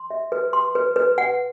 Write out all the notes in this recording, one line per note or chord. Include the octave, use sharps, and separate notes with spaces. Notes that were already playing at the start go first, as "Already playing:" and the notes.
Already playing: C6
E5
B4
C6
B4
B4
F#5